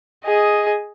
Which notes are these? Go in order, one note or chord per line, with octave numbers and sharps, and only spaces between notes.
G#4 D#5